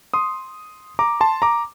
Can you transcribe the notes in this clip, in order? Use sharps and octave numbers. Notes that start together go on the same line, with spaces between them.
C6 D#6
A#5 D6
A5 C6
A#5 D6